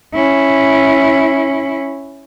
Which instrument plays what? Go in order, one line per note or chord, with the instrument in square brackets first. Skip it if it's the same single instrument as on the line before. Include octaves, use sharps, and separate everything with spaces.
[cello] C#4 E4